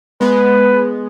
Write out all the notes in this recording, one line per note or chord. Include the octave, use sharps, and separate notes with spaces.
G#3 B3 B4